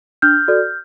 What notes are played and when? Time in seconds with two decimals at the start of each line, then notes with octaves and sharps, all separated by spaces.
0.22 D4 F6 G6
0.48 F#4 A4 D5